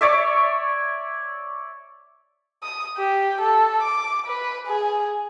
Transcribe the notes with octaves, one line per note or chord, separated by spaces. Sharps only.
C#5 D5 E5
D#6
G4
A4
D6
B4
G#4